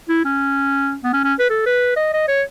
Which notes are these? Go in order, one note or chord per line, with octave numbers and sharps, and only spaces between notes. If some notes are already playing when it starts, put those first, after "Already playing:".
E4
C#4
B3
C#4
C#4
B4
A4
B4
D#5
D#5
C#5